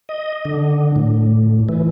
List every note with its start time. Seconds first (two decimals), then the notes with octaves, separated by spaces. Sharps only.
0.09 D#5
0.45 D3
0.96 A2
1.69 E3